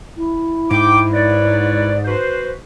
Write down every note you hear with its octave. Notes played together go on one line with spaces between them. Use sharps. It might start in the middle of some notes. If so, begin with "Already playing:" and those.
E4
G#2 G5 D6
B4 C#5 D5
F#4 B4 C5